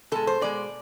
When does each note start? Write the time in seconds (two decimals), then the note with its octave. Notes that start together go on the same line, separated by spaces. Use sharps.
0.12 B2 G#3 A4
0.27 C5
0.41 B2 G#3 D5